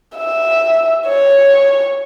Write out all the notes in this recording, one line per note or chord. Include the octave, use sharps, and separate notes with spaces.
E5
C#5